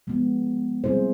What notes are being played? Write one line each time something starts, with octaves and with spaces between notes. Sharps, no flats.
F3 G#3 B3
G3 C4 E4 G#4 C5